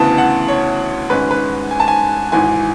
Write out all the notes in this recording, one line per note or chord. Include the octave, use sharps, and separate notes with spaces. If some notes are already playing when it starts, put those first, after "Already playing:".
Already playing: D2 C#3 E3 B3 A5
F#5
C#5
G#1 G#2 G#3 C#4 B4
B4
G#5
A5
G#5
G#1 G#2 E3 G#5